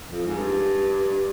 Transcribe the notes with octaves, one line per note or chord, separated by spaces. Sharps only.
F2
G#2
G2